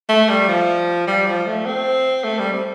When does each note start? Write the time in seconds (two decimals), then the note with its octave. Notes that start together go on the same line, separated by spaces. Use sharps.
0.09 A3
0.29 G3
0.48 F3
1.07 G3
1.27 F3
1.46 A3
1.66 C4
2.24 A3
2.39 G3
2.53 C4